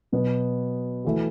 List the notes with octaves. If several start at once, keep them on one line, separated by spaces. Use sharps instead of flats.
B2 F#3 B3
E3 A3 F#4